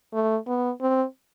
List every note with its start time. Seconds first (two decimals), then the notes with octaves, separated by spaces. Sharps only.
0.14 A3
0.47 B3
0.81 C4